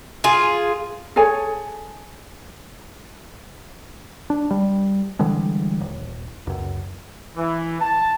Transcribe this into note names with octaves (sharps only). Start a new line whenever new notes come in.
F4 G#4
G#4 A4 C#5 G#5
D4
G3
D3 E3 G3 G#3
D#1
C#2 F#2
E3
A5